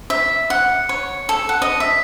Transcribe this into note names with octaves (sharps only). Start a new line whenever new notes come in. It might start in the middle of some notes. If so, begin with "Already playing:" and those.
E5
F#5
C#5
A4
F#5
D#5
E5